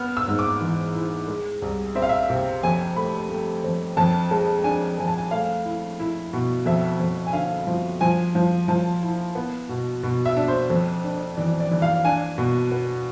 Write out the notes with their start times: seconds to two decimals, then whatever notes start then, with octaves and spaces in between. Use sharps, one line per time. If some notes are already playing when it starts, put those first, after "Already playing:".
Already playing: B3 F6
0.17 E6
0.28 G#2
0.39 D6
0.61 E3
0.95 E4
1.28 G#3
1.62 C2
1.95 C4 E5
2.02 F5
2.09 E5
2.30 C3
2.63 F2 G#5
2.96 A3 B5
3.30 A3
3.64 F2
3.97 F2 A5
4.31 G#3 A5
4.64 D4 G#5
4.98 F2 G#5
5.08 A5
5.18 G#5
5.31 A3 F5
5.65 E4
6.00 E4
6.33 B2
6.66 F2 E5
7.00 F2
7.27 G#5
7.33 D3 F5
7.67 F3
8.01 F3 G#5
8.35 F3
8.68 F3 A5
9.02 E4
9.35 B3
9.69 B2
10.03 B2
10.26 E5
10.37 D4
10.48 C5
10.70 F2
11.04 D4
11.37 E3 D5
11.60 D5
11.71 E3
11.82 F5
12.05 D4 G#5
12.38 B2
12.71 B3